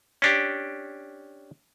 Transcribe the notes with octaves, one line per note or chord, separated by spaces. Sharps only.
C#4 D4 G4